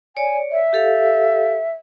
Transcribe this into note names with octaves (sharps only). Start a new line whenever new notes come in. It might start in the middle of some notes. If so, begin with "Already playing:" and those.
C#5 D5 G#5
E5
G4 A4 F5